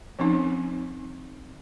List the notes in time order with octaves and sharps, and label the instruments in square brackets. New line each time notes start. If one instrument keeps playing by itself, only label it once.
[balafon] F3 C4 C#4 D#4